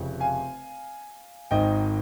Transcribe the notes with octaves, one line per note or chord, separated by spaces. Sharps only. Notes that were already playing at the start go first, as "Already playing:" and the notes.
Already playing: F1 F2 C#3
F5 G#5
G#1 G#2 D#3 D#5 G5